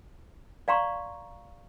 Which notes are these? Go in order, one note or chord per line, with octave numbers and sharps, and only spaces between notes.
D5 F5 A#5 C6 C#6